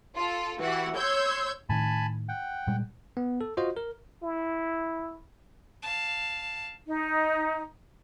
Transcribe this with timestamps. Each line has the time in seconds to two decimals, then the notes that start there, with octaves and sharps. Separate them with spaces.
0.16 F4 A4
0.59 E3 F#4 G4 F#5
0.96 C#5 C6 E6 G6 G#6
1.69 A2 D#3 G#5 A5 B5
2.29 F#5 G5
2.67 A#2 G3 G#3
3.17 B3
3.41 A4
3.57 F4 F#4 C5 D#5
3.77 A#4
4.23 E4
5.82 F5 A5
6.86 D#4